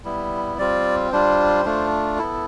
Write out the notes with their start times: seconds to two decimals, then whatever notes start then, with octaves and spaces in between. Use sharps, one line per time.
0.05 G3 B3 E4
0.58 G3 C4 F4 D5
1.12 G3 D4 F4 C5
1.65 A3 D4 F4
2.18 B3 E4 A4